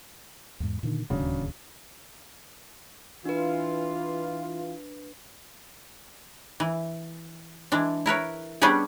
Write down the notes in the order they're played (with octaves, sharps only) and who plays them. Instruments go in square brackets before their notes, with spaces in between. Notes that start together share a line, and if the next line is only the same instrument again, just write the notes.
[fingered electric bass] E2 G#2
A#2 D3 D#3
[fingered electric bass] D1 D#2 [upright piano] C#3 F#3 D4
[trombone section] E3 F4 [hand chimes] D4 B4
[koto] E3
E3 G#3 D4
E4 A#4 B4 C#5
G3 B3 C#4 D4 G4 G#4